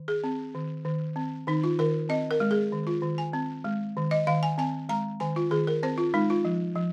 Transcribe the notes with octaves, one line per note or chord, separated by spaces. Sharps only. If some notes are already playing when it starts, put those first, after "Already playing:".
Already playing: D#3
G#4
C4
D#3
D#3
C4
D#3 D#4
F4
D#3 A#4
C4 D#5
A#4
G#3
G#4
D#3
F4
D#3
G#5
C4
G#3
D#3
D#5
D#3 F5
G#5
C4 G#5
G#3 A#5
D#3 G#5
F4
D#3 G#4
A#4
C4 C5
F4
G#3 D#4
F4
F3
F3